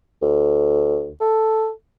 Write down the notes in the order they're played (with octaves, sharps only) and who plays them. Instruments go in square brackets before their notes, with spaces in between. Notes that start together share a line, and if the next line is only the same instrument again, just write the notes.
[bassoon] D2
A4